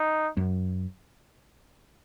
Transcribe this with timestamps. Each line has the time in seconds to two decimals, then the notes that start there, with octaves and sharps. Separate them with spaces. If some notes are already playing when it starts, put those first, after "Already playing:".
Already playing: D#4
0.37 F#2